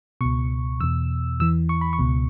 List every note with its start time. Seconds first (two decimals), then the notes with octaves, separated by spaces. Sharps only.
0.21 C#2 B2 C#6
0.81 E2 B2 E6
1.40 E2 E3 E6
1.69 C#6
1.81 B5
1.93 C#6
1.99 C#2 B2